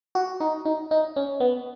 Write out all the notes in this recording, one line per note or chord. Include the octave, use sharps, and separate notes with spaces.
F#4
D#4
D#4
D#4
C#4
B3